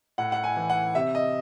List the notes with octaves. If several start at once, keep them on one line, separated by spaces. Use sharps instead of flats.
A2 F#5
F#5
G#5
E3
F#5
C3 E5
D#5